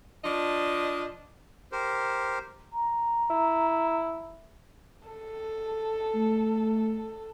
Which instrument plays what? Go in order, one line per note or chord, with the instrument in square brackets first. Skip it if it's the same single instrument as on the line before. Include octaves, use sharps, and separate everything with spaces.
[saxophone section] F3 D4 D#5
[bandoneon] G4 A#4 C5
[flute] A#5
[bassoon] E4
[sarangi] A4
[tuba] A3